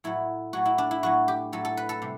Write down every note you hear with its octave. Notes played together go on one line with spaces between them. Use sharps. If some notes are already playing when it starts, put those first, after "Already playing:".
A2 F#3 A3 E4
A2 F#3 A3 F#4
E4
D4
E4
A2 F#3 A3 F#4
G4
A2 F#3 A3 A4
A4
B4
A4
C3 G3